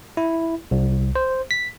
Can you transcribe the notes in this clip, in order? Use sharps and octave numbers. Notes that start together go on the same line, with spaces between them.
E4
C2
C5
B6